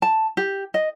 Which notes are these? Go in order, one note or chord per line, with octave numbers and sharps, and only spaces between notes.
A5
G4
D#5